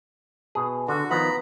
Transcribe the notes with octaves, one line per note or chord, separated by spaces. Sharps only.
B2 G#4
D3 F#4
D#3 F3 B3 A#5 B5